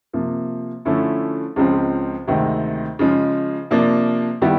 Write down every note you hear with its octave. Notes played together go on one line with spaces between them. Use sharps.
C3 F3 A#3
D3 F3 A3 C#4 E4
C#2 C#3 F3 G#3 C4
D2 C3 D#3 G#3 C4
C#3 F3 G#3
C3 F3 A#3 D4
D#3 G3 B3 E4 G4